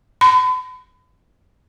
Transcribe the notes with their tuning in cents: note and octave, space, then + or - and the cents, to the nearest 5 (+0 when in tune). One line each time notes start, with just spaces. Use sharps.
B5 +40